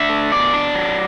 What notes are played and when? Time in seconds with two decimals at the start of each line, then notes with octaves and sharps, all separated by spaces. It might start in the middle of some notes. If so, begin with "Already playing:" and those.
Already playing: D4 E5
0.09 A3
0.32 B2 D5
0.54 D4
0.75 F#3